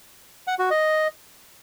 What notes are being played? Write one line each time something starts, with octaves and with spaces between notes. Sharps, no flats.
F#5
F#4
D#5